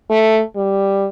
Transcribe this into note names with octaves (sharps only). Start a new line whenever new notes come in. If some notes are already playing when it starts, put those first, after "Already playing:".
A3
G3